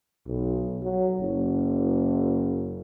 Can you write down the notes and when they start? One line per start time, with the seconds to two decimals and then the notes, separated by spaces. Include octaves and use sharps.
0.27 B1
0.82 F#3
1.21 F#1